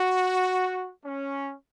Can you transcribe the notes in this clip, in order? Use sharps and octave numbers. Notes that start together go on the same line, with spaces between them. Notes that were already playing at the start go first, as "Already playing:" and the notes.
Already playing: F#4
C#4